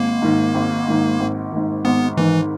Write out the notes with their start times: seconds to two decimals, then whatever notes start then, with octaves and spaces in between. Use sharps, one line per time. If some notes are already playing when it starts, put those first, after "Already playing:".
Already playing: G#1 A#3
0.22 G#2 D#3
0.55 G#1
0.88 G#2 D#3
1.20 G#1
1.52 G#2 D#3
1.85 G#1 B3
2.17 G#2 D#3 E3